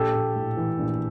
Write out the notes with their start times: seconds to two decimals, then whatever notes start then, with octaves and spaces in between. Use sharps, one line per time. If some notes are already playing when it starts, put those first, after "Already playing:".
Already playing: A#1 G4 A4
0.14 A#1
0.36 A2
0.57 E3
0.79 A#1